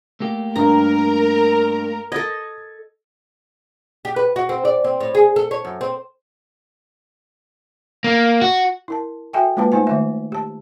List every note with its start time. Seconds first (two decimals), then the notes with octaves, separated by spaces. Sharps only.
0.20 A3 A#3 G4
0.56 G2 A#4 A#5
2.12 A4 D#5 G#6 A#6
4.05 G4
4.16 B4
4.36 F#4
4.49 C4
4.65 D5
4.84 C4
5.00 A2
5.15 G#4
5.36 A4
5.51 C#5
5.65 F#2
5.81 C4
8.04 A#3
8.42 F#4
8.88 E4 A#4 A5
9.33 F#4 A4 E5 G5 G#5
9.57 G#3 A#3 F4 B4 A5
9.72 A3 D#4 C5 G#5
9.87 D#3 A3 E5
10.32 G4 A5